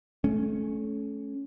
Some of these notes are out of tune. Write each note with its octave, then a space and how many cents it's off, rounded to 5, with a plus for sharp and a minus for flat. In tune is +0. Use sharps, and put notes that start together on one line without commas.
A3 -25 C#4 +0